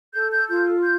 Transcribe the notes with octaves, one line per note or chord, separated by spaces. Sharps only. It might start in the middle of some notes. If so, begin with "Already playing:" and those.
A4 G6
G6
F4 G6
G6